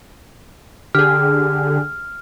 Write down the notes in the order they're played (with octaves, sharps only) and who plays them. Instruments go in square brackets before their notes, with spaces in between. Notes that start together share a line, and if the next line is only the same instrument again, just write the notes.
[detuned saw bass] D3 [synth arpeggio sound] G4 G#4 [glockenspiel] F6